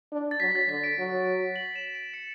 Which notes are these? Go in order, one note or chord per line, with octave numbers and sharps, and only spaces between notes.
D4
A6
F#3 B6
A6
D3 B6
D7
F#3
F#7
E7
D7
C#7